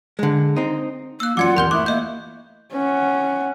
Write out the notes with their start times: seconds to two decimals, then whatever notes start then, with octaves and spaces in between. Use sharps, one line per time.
0.19 D3 G#3
0.57 C4 D#4
1.20 A#3 E6 F#6
1.37 F#2 F4 D5 F#5 D6 G#6 C#7
1.57 D#1 E2 A#4 C6 G6 G7
1.71 A3 E4 E5 D6 D#6 F#6
1.86 A#3 D#5 G6
2.73 C#4 F#5